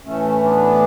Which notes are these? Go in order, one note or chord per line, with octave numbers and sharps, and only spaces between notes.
A2 E3 A3 C#4
B3 D4